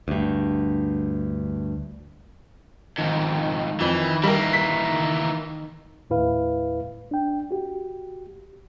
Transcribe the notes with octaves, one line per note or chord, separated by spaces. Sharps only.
D2 G2
F2 G#2 D#3
F2 E3
E3 G3 A#3 A#4
B6
D#2 A2 E4 B4 F5
D4 G5
F#4 G4